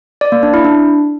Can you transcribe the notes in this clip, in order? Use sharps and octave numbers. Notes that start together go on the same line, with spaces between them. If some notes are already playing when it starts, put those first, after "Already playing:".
D5
A#3
D4
E4
D4